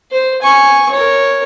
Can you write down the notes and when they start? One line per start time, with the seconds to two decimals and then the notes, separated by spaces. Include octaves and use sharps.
0.11 C5
0.42 G#5 C#6
0.91 A#4 C#5